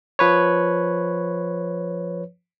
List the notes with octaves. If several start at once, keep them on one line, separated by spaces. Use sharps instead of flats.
F3 B4 C#5